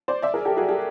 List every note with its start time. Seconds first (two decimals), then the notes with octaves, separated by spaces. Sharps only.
0.08 C5 D5
0.22 D5 E5
0.34 G#4 A#4
0.45 G4 A4
0.57 F#4 G#4
0.69 G4 A4